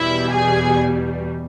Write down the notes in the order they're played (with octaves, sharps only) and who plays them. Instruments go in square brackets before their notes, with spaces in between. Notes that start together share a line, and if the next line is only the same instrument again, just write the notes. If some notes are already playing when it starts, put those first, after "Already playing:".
Already playing: [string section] E2 B2 G3 E4 E5
G#4 G#5